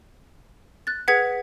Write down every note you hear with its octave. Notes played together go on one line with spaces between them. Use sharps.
F#6 A6
G#4 B4 F#5 G#6 B6